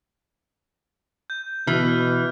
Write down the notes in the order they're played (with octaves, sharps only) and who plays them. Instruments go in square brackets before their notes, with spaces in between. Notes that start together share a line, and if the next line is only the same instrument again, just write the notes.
[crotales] G6
[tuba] B2 [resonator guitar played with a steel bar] E3 [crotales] F6